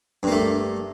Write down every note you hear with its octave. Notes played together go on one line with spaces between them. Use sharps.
G2 A3 A#3